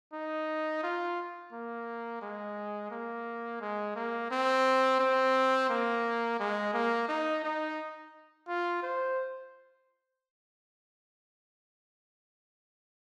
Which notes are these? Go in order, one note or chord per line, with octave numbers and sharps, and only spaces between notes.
D#4
F4
A#3
G#3
A#3
G#3
A#3
C4
C4
A#3
G#3
A#3
D#4
D#4
F4
C5